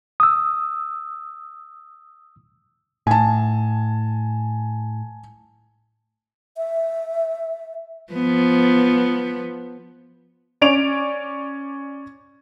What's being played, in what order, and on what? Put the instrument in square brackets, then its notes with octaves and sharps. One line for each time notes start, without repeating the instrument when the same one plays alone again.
[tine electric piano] D#6 E6
[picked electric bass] A2 [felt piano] G#5 A5
[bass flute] E5
[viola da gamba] F3 B3
[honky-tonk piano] C#4 D5 D7 F7